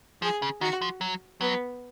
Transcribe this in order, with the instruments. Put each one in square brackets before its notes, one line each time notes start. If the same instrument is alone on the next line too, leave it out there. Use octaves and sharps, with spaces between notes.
[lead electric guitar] F3 [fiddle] G#4
[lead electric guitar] C#3
[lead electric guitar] D#3 [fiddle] F#4
[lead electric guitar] F3
F#3
[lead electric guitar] F#3 [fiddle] B3